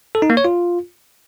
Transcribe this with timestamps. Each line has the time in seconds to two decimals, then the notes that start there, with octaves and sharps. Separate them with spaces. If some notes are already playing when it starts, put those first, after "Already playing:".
0.15 A4
0.22 D#4
0.30 A#3
0.37 C#5
0.45 F4